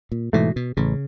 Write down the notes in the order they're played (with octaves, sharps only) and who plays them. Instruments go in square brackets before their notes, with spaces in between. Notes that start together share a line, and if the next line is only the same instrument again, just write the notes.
[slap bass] A#2
[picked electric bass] G#2 E3 A3 [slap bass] B2
[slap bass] B2
[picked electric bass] A1 [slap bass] C#3